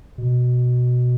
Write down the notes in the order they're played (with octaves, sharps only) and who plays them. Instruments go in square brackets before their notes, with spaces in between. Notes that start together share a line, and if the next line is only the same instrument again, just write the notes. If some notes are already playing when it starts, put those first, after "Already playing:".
[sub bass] B2